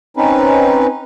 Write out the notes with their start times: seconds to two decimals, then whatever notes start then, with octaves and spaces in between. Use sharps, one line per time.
0.17 C4 C#4 D#4 B4